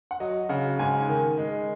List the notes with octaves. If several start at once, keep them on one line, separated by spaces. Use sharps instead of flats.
F#5
F#3 D#5
C#3 F#5
G#2 G#5
D#3
G#3